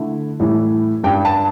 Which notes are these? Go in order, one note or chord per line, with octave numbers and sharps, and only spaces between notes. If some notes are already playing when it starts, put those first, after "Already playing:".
Already playing: D3 A3 E4
A2 E3 G3 E4
G2 G3 D4 G5
A5